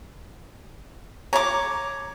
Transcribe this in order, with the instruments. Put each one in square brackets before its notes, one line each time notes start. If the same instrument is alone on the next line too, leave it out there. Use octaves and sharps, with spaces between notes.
[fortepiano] C#5 [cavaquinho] A#5 D6